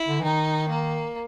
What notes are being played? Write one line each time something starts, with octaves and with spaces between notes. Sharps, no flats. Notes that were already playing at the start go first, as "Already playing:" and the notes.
Already playing: E4
D3
E3
D#3 D#4
A#3